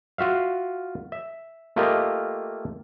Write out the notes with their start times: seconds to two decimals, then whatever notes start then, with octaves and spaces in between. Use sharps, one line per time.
0.18 F4 F#4 E5 F5
1.12 E5
1.76 A3 A#3 F4 G4 D#5